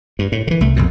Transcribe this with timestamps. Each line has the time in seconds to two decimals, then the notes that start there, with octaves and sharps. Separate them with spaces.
0.19 G2
0.32 A2
0.47 D3 E3
0.61 C2 A3
0.76 B1 F2 A#2